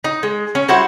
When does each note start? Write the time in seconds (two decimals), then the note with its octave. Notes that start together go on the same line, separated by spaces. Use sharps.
0.04 D#4
0.23 G#3
0.55 C#4
0.68 G3 E4 F#4 C5